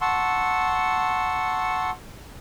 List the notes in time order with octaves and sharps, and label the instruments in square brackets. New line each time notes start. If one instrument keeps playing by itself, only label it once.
[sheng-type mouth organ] F#5 A5 C6 C#6 E6